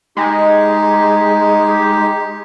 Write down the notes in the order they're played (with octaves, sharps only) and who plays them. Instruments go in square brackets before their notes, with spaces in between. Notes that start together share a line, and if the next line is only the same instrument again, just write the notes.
[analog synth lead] G#3 [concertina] D#4 G4